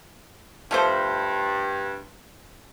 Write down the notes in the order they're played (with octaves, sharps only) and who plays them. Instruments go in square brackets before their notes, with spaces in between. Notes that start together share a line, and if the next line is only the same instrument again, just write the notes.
[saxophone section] G2 [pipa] F3 A3 C5